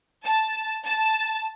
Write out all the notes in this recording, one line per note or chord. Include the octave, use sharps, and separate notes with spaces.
A5
A5